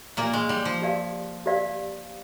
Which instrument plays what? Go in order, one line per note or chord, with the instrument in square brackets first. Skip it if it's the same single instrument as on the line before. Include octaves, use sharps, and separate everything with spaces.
[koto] A#2 A#3 [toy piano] G4 D5 F5
[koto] G#3
G3
F3
[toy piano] G4 D5 F5
G4 D5 F5